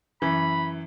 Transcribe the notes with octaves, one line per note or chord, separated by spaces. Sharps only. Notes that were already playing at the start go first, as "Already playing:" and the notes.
F#2 E3 B5